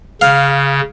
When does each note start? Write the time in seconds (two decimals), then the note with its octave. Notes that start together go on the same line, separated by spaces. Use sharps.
0.21 C#3 F5